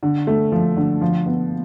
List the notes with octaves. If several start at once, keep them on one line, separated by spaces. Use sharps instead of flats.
D3
A3
F3
D3
F3
B3